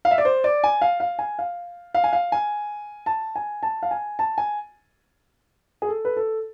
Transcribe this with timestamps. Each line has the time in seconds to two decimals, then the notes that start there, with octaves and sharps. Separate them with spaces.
0.05 F5
0.11 E5
0.18 D5
0.25 C5
0.44 D5
0.64 G#5
0.82 F5
1.00 F5
1.19 G#5
1.39 F5
1.95 F5
2.04 G#5
2.13 F5
2.32 G#5
3.06 A5
3.36 G#5
3.63 A5
3.83 F5
3.91 G#5
4.19 A5
4.38 G#5
5.82 G#4
5.88 A4
6.05 B4
6.16 A4